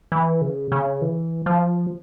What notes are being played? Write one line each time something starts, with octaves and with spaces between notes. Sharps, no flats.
E3
C#3
C#3
E3
F3